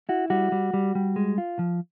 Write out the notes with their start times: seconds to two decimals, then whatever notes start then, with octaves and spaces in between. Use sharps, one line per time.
0.09 E4 F#4
0.30 G3 F#4
0.52 G3
0.74 G3
0.95 G3
1.16 G#3
1.38 F4
1.59 F3